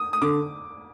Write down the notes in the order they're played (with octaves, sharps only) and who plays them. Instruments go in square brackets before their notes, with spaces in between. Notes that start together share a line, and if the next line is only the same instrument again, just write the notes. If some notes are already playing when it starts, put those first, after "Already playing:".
Already playing: [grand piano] D#6
D#6
[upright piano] D3 [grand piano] D6